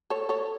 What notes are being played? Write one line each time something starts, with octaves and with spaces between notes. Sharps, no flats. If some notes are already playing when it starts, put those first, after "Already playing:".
A4 C#5
A4 C#5